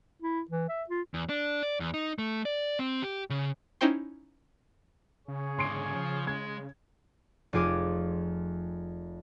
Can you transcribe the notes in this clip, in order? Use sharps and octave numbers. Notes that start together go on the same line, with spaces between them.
E4
E3
E5
F4
E2
D4
D5
E2
D#4
A3
D5
C4
G4
C#3
C#4 D#4 E4 C5 G5 C6
C#3 G#4 C#5
G#2 D3 C6 C7 D7
F3
G#3 G#6
F1 F2 F4 G#4 D6 D#6